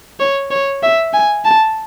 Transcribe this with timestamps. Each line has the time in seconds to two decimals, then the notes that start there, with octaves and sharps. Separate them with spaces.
0.20 C#5
0.51 C#5
0.83 E5
1.14 G#5
1.45 A5